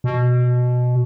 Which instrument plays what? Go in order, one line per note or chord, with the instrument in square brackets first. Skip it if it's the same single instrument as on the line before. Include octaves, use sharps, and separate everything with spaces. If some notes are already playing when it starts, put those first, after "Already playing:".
[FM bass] B2